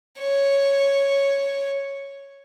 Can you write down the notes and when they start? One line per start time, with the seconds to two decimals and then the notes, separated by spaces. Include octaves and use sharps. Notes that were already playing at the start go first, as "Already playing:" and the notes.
0.19 C#5